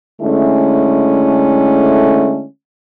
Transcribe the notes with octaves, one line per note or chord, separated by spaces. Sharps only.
D3 G#3 A3 C#4 E4